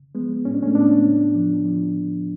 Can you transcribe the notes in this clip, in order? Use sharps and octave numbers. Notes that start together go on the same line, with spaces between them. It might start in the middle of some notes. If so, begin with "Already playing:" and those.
Already playing: C#3
F3 G#3 B3
A2 C#4
D4
A3 C#4
A2 B3 D4
C#3
F3
F3